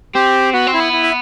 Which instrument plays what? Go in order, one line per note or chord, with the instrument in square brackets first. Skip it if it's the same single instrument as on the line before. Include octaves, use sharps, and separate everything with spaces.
[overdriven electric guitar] C4 [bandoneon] G4
[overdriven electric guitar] B3 [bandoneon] F#4
[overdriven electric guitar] C4
[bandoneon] E4
[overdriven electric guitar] B3
[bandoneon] E4
E5